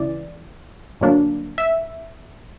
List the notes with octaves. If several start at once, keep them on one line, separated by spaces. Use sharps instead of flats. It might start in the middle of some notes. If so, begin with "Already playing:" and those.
Already playing: C#2 C#3 E3 D5
G2 D3 F#3 A#3 D4
E5